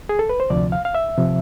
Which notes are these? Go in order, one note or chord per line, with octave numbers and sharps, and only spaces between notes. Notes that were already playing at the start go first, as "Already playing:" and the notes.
G#4
A4
B4
C5
D2 C3 F3 D5
F5
F5
E5
C3 F3